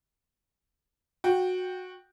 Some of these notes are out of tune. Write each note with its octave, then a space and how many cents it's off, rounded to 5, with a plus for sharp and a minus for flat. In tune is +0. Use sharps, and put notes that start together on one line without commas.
F#4 -15 G5 +0